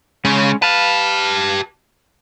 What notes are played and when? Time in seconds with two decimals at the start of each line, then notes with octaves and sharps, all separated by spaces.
0.25 C#3 G#3 C#4
0.62 G4 B4 F5 A5